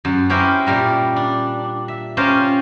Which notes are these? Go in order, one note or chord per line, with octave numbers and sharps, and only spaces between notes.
F#2
C#4 E4 G4 A#4 C5
A#2 G3 A#4
D4
E5
C#4 F4 G4 A#4 C5